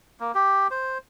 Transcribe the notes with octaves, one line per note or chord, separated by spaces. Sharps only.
A#3
G4
C5